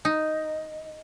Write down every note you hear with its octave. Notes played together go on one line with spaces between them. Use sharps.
D#4